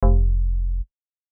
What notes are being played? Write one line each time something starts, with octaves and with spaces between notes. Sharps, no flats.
F1